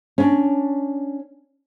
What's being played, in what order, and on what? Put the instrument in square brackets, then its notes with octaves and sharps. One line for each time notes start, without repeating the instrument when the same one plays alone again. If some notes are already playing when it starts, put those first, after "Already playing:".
[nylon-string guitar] C#4 D4